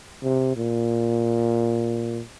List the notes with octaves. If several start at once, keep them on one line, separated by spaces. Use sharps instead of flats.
C3
A#2